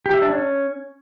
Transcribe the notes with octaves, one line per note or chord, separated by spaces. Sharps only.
G4
E5
D4
C#4